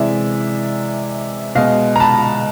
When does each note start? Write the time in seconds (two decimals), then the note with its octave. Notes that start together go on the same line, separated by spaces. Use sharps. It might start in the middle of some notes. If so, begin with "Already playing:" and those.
Already playing: C3 E3 G#3 D5 E5
1.55 B2 G#3 D#5 F5
1.96 A#5
2.00 A5 B5